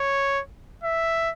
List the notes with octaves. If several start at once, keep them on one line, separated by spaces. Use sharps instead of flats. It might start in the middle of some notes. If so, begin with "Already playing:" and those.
Already playing: C#5
E5